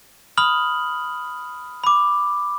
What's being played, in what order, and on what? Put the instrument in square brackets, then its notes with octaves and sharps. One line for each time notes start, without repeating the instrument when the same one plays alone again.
[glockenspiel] B5 D#6 F6 F#7
B5 D6